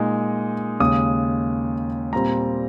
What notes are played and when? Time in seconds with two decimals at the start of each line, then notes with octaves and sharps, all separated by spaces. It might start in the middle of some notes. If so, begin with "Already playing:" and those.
Already playing: A#2 G#3 D#4
0.80 D#2 C#3 G#3 D#6
2.13 A#2 G3 C4 A#5